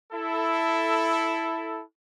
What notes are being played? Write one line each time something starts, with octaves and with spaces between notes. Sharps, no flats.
E4 A4